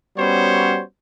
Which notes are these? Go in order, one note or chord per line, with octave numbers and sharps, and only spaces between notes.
G3 B3 C#4 F#4 C5 C#5